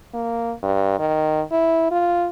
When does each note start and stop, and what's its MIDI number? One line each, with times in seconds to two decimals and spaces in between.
0.14 0.52 58
0.63 0.98 43
0.99 1.41 51
1.51 1.89 64
1.91 2.28 65